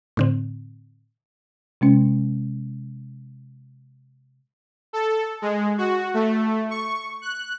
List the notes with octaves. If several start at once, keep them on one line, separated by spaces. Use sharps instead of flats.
A2 D3 C4
C3 G#3 C#4
A4
G#3
F#4
A3
C#6
F#6